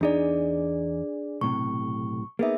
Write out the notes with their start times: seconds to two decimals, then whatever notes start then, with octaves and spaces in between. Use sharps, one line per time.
0.01 E2 D4 D#4 G#4 D5
1.41 B1 A2 C3 C#6
2.39 A#3 B3 D#4 G#4 E5